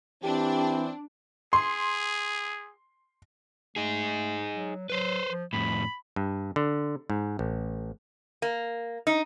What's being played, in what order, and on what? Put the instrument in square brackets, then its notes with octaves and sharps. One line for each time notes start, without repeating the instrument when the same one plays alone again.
[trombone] E3 [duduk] C4 [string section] D4 [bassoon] G4
[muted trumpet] G#4 [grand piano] C6
[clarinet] A3 [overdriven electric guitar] D#4 G#4
[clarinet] F#3
[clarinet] F#3 [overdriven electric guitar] B4 C5
[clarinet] F3
[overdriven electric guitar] F2 A2 [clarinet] B5
[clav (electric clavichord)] G2
D3
G#2
A1
[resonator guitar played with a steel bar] A#3
D#4